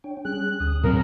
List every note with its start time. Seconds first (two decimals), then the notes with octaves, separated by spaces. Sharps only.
0.04 D4 C#5 G5
0.25 G3 C#4 G#4 F#6
0.60 D2 D#6
0.84 A2 F#3 C4 A#4